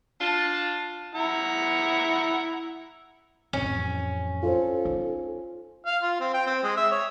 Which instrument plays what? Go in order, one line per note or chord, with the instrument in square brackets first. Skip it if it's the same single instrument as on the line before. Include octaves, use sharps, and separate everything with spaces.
[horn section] D4 F4 A5
[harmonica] E4 F#5 A#5
[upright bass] A1 F2 [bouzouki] C#4
[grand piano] F4 C5 [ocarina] A4
[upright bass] D#4
[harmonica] F5
F4
C4
G5
C4
G#3
E5
C#5